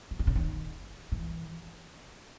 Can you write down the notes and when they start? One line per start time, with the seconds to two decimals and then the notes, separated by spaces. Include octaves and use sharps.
0.11 E3
0.19 D#3
0.27 C#3
0.35 D#3
1.12 E3